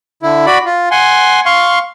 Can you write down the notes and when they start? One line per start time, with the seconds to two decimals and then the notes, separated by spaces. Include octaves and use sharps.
0.23 D3 E4
0.46 F#4 D5 B5
0.66 F4
0.91 F#5 G#5 C6
1.46 F5 C6 C#6